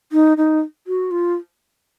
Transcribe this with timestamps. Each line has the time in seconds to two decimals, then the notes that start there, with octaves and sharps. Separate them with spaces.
0.12 D#4
0.37 D#4
0.87 F#4
1.11 F4